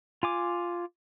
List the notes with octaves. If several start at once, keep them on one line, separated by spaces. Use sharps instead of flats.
F4 G#5 D6